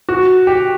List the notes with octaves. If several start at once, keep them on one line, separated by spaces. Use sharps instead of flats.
F#4
G4